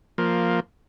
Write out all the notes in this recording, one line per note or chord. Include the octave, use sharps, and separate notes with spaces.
F3 A#3